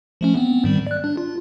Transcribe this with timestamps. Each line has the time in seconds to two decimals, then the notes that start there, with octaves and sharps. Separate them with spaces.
0.21 F3 A3 C#4
0.36 B3 C4
0.64 G#2 D#3 G3
0.87 D5 F#6
1.04 D4
1.17 F4